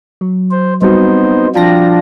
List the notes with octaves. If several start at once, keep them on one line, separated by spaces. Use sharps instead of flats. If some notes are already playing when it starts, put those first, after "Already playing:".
F#3
C5
G3 B3 C4 D#4 F#4 C5
F3 D4 F4 G5 A5 A#6